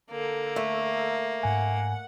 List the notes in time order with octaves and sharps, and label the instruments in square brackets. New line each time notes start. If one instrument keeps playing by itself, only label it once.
[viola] D3 A4 [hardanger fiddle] A#3
[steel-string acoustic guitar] A3
[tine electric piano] G#2 G#5 [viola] F#5